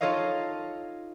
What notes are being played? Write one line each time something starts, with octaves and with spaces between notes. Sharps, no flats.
D#4 F4 A4 C#5 D#5 F5